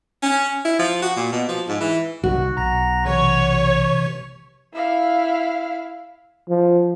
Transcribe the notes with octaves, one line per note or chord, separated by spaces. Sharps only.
C#4
E4
F3
F#4
A#2
B2
F3
G#2
E3
C2 D#3 F#3 F#4
B1 A#5 A#6
C3 E3 C#5
E4 F5
F3